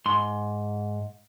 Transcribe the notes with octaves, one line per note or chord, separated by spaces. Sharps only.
G#2 C6